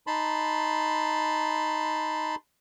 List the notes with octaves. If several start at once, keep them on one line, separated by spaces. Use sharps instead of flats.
D#4 A5 B5 C6